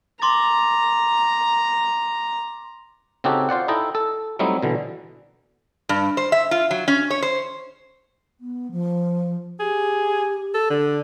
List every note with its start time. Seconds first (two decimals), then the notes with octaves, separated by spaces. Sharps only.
0.22 A#5 C6 D6 A6
3.24 C#3 C4 D#4 F#4 G4 A4
3.49 F4 C5 D5 F#5
3.68 D#4 E4 A4 D#5 G5
3.95 A4
4.39 F#3 G3 A3 C4 D#4 E4
4.63 B2 D3 E3
5.89 G2
6.17 C5
6.32 E5
6.51 F4
6.71 F#3
6.88 C#4
7.10 C#5
7.22 C5
8.40 B3
8.72 F3
9.60 G4 G#4
10.54 A4
10.70 D3 A4